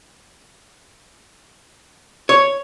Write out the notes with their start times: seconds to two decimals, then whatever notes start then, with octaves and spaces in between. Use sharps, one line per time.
2.29 C#5